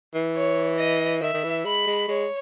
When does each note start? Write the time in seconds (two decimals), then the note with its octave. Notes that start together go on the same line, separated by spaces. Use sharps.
0.14 E3
0.36 C#5
0.78 D#5
1.22 D#3 E5
1.34 D#3
1.44 E3
1.65 G#3 B5
1.87 G#3
2.08 G#3 C#5